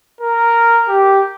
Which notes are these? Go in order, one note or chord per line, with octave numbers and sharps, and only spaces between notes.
A#4
G4